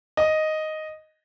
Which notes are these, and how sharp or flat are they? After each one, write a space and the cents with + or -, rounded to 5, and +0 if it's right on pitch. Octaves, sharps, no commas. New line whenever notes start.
D#5 +0